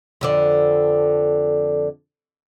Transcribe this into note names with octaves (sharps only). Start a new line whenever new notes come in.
F2 D3 D5